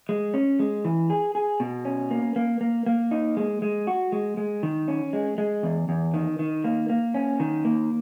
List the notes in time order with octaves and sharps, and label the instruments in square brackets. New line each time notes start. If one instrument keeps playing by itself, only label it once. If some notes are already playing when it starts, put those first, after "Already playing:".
[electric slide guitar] G#3
C#4
G#3
E3
G#4
G#4
B2
C#4
A#3
A#3
A#3
A#3
D#4
G#3
G#3
F#4
G#3
G#3
D#3
C#4
G#3
G#3
E2
E2
D#3
D#3
A#3
A#3
C#4
D#3
A#3